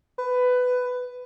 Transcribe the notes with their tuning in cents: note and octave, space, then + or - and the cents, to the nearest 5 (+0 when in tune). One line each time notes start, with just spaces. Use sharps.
B4 +15